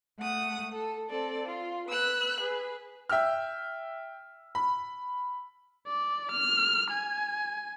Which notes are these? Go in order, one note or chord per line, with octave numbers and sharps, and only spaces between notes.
A3 F#5 D#6
A4
C4 A4 D5
F4
B4 E6 F#6
G#4 B4
E5 G5 E6 F6
B5
D5
F6
G#5